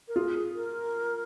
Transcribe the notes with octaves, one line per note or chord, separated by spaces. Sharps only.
A#4
F4 G#4
A#4